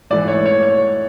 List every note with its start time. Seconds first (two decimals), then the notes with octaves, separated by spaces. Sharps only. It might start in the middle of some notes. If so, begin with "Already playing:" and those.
0.10 G#2 E3 A3 D5
0.28 C#5
0.46 C#5
0.63 C#5